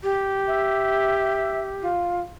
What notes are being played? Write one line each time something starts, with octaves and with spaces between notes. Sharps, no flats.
G4
E5
F4